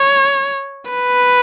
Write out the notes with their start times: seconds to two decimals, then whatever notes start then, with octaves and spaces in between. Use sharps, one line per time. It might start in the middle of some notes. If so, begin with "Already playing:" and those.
Already playing: C#5
0.91 B4